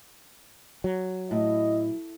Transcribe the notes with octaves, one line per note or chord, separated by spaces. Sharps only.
F#3
A2 E4 D#5